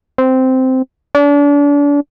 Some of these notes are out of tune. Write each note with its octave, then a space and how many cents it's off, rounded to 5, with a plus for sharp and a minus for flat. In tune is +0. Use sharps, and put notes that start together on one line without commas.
C4 -10
D4 -35